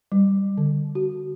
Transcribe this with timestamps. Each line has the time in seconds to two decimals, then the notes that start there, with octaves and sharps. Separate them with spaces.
0.12 G3
0.58 D3
0.95 F#4